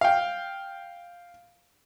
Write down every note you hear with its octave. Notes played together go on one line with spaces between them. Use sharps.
F5 G5